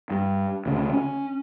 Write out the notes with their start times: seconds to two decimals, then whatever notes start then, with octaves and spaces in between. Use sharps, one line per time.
0.11 G2
0.66 D2 C#3
0.93 C#4